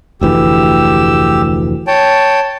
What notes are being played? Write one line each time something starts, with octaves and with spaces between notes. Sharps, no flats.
F1 D2 E3 G4 E6
C#5 G5 A5